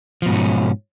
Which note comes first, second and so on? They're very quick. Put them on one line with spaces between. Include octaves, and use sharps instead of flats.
F3 B2 G#2 C#4